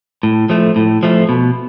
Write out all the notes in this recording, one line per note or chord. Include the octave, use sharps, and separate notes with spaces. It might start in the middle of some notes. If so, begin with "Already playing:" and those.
A2
F3 A3
A2
F3 A3
B2